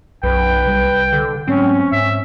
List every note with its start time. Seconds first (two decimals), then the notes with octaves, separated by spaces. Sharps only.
0.23 B1 F#2 B4 G5
0.65 C2 G3
1.13 D3
1.48 G#2 F#3 A3 C4 C#4
1.92 G#2 E5